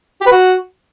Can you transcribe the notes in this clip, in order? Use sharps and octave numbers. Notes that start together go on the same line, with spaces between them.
G4
B4
F#4